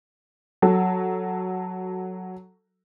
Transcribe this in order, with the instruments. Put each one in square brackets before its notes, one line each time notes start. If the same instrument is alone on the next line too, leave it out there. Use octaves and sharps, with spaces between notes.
[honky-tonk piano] F#3 A4